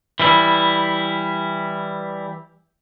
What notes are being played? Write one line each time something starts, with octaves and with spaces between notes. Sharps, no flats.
E3 G3 E4